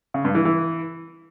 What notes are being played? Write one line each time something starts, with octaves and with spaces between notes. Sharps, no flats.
C#3
G2
E3
E3